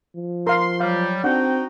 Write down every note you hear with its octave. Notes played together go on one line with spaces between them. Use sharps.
F3
A#4 F5 C6
F#3 G3 F5
C4 D4 D#4 F#4 F#5 G5